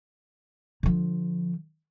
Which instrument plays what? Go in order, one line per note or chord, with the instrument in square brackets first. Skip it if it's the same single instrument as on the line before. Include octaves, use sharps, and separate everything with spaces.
[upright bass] D3 F3